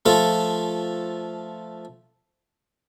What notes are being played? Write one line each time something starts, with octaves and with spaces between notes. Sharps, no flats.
F3 A3 F4 A4